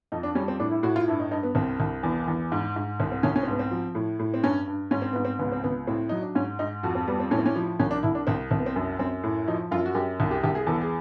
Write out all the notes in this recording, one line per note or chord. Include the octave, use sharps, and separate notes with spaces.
F2 D#4
D4
G3 C#4
C4
A2 D4
E4
A2 F#4
F4
G2 E4
D#4
G2 D#4
B3
C2 C4
C2
E2
E2
G#2
G#2
C2 C4
C4
C2 C#4
C#4
C4
G#2 B3
C4
F3
A2
A2
C4
G2 C#4
G2
G#2 C#4
C4
G#2 B3
C4
C#2 B3
C4
C#2 B3
A2 C4
F#3 D#4
D4
G#2 C#4
G#2 D#4
F2 F#4
C4
G3 B3
C4
A2 C#4
C4
C#4
F3
C2 C#4
D4
C2 E4
D4
C2 C4
C2 C4
B3
C4
F#2
F#2 C4
A2
F3 D#4
F#2 F4
F#4
F#2 G4
C2
G4
C2 G4
G#4
E2 A4
G#4